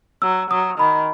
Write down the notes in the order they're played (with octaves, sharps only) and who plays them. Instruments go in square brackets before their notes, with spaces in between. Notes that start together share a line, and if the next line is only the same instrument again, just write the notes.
[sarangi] F#3 [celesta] E6
[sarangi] F#3 [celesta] D#6
[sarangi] D#3 [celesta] B5